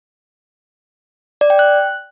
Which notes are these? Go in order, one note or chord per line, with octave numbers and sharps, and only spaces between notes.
D5
G5
F#6